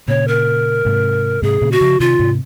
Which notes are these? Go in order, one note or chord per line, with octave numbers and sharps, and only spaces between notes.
A#2 C#3 C#5
A#4
G#2 C3
G#2 C3 G#4
A#2 C#3
F#4
C#3 F3
C3 D#3 F4
G#2 C3